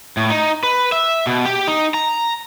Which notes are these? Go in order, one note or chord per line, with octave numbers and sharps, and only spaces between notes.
A2
D#4
B4
E5
B2
G4
D#4
A#5